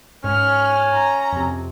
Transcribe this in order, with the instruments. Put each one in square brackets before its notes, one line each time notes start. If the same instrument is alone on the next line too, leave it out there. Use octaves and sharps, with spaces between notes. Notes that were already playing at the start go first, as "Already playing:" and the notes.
[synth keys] G#2 [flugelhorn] C#4 [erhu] F6
[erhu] A#5
[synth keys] F2 C3